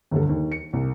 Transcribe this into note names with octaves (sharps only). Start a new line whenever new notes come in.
G1 D2 A4
D#2
C#7
C2